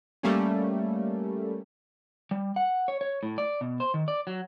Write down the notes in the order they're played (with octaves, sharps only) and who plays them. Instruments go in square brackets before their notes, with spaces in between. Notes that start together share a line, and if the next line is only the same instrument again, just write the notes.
[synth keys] G3 A3 A#3 C#4
[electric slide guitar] G3
F#5
C#5
C#5
A2
D5
B2
C5
D#3
D5
F#3